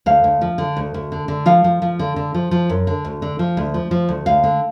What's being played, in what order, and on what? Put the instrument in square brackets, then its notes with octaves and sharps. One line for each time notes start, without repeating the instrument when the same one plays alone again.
[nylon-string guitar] D2 F5
D2
F3
D3
D2
D2
D3
D3
F3 F5
F3
F3
D3
D3
F3
F3
F#2
D3
D2
D3
F3
D2
F3
F3
D2
D2 F5
D3